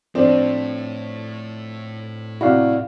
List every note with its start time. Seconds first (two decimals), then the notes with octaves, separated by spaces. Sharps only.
0.15 A2 F3 C4 D4
2.41 C3 E4 F#4 D5 F5